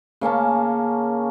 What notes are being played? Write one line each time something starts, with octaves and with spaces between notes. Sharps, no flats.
C#3 A#3 C#4 A5